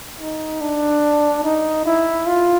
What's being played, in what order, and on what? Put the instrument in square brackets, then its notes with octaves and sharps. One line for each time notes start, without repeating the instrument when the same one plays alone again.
[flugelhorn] D#4
D4
D#4
E4
F4